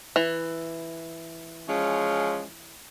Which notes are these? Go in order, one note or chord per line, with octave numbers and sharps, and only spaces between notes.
E3
F3 G#3 C#4